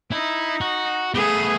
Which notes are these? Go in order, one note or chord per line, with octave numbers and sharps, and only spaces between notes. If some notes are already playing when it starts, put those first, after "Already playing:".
D#4 E4
F#4
A3 B3 G#4 B4